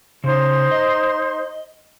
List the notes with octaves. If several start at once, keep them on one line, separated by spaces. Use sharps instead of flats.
C#3 D#4 C5 C6
D#5